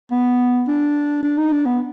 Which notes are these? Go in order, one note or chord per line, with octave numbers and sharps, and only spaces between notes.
B3
D4
D4
D#4
D4
B3